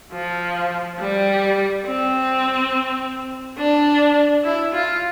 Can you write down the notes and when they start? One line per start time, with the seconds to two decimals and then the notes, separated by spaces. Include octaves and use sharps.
0.12 F3
0.99 G3
1.85 C4
3.58 D4
4.44 E4
4.74 F4